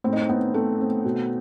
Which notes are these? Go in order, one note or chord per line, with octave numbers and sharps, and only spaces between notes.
A2 C4
D#4
C4
A2 B3
A3 C4
C4
B2